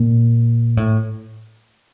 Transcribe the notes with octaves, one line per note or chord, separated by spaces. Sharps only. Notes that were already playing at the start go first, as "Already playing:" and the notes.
Already playing: A#2
A2